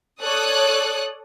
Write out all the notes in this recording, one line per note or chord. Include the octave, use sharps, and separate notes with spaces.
A4 C#5 D5 D#6 F#6